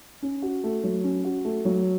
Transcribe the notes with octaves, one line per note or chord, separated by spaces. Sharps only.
C#4
F#4
A3
F#3
C#4
F#4
A3
F#3